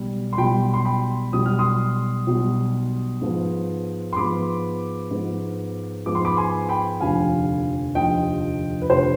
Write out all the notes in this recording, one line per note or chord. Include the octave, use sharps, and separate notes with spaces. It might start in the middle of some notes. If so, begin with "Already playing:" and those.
Already playing: B1 B2 G3
C6
B1 B2 G3 G5 B5
C6
G5 B5
B1 B2 G3 D#6
F6
C6 D#6
B1 B2 G3
G#2 F3 B3
C6
G#2 F3 B3 B5 D6
G#2 F3 B3
G#2 F3 B3 D6
C6
B5 D6
G#5 C6
G5 B5
F1 D#2 D3 F3 F5 G#5
F1 D#2 D3 F3 D#5 G5
B4
F1 D3 F3 C5